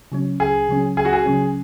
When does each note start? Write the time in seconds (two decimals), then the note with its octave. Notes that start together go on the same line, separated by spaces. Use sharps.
0.12 C#3 F#3 C#4
0.40 C#2 G#4
0.68 C#3 F#3 C#4
0.97 C#2 G#4
1.05 F#4
1.13 G#4
1.26 C#3 F#3 C#4